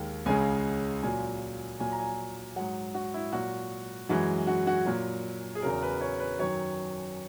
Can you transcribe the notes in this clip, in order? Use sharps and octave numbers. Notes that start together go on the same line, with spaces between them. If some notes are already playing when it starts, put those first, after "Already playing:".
Already playing: D#2 D#3 G#3
C#2 C#3 G#3 G#5
A#2 F#3 G#5
A#2 F#3 G#5
A#5
G#5
G#2 F#3 F#5
F#4
E4
A#2 F#3 F#4
F#2 E3 G#3 F#4
F#4
F#4
A#2 F#3
G#4
E2 C#3 F#3 A#4
B4
C#5
B4
F#2 D#3 F#3 C#5